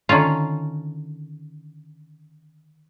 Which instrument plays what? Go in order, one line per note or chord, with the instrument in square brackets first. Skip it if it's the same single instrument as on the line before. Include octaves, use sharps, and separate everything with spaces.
[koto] D3 D#3 C#4 F4